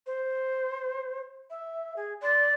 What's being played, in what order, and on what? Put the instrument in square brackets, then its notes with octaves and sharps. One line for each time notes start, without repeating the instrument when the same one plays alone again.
[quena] C5
E5
G#4
[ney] D5 [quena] C6